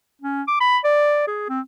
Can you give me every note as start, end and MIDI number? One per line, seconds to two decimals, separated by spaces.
0.22 0.42 61
0.48 0.57 86
0.61 0.78 83
0.84 1.24 74
1.27 1.46 68
1.49 1.60 60